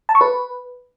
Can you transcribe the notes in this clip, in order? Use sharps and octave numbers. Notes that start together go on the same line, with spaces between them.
A5
C#6
B4